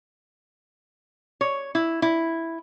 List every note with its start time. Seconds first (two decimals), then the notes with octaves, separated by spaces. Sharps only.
1.41 C#5
1.75 E4
2.02 E4